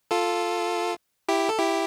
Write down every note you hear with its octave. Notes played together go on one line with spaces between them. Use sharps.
F4 A4
E4 G4
A4
E4 G4